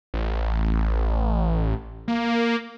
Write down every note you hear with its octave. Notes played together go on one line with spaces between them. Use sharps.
A1
A#3